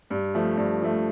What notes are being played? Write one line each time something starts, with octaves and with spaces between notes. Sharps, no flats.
G2
F3 A3
G2
F3 A3